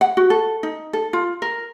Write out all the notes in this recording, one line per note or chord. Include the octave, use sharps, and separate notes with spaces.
F#5
F#4
A4
D#4
A4
F4
A#4